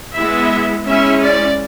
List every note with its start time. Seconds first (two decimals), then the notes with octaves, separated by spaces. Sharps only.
0.15 G#3 B3 E4 E5
0.86 G#3 C#4 E4 E5
1.22 D5